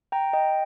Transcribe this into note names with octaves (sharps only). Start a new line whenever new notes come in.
G5 A#5
D#5 G5